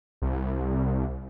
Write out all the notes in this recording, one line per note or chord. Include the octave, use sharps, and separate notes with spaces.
C2